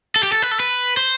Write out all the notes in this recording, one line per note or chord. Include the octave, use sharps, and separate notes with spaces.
A4
G4
A4
B4
A4
B4
C5